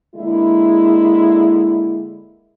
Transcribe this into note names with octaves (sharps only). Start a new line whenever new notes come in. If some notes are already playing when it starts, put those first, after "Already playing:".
D3 G#3 A#3 E4